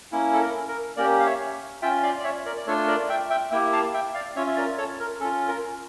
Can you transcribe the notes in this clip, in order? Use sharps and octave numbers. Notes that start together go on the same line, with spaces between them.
A#3 C#4 E4
A4
A#4
A#4
A#3 C#4 G4 A#4 D5
F5
C#5 E5
C#4 F4 E5 G5
D5 F5
D5
C#5 E5
A#4 D5
D5
A3 D4 F4 A4 C#5
A#4 D5
E5 G5
E5 G5
A#3 E4 G4 E5 G5
F5 A5
E5 G5
D5 F5
C#4 F4 C#5 E5
E5
A#4 D5
A4 C#5
A#4
C#4 F4 A4
A#4